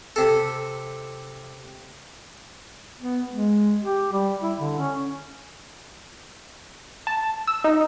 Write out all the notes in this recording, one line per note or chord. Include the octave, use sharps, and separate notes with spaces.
C3 A4
B3
G#3
G4
G3
E4
D3
C#4
A5
E6
D#4